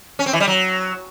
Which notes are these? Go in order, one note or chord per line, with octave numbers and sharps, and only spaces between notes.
C#4
C4
E3
G3
F#3